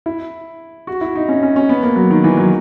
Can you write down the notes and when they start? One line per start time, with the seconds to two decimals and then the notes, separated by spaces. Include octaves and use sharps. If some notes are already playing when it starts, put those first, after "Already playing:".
0.06 E4
0.87 F#4
1.01 E4
1.16 D#4
1.29 C#4
1.43 C#4
1.56 C#4
1.69 B3
1.83 A#3
1.96 F#3
2.10 D#3
2.24 E3
2.37 F#3